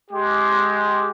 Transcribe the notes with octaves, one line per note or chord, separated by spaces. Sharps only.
G#3 G4